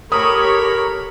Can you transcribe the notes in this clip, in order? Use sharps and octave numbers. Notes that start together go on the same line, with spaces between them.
G4 A4 A#4 C#5 B5 D#6